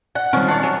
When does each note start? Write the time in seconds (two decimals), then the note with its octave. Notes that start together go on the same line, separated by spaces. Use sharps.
0.15 D5 F#5
0.33 D#3 F3 G3 C4 C#4
0.48 D4 C#5 F#5 A5
0.63 F#3 G#5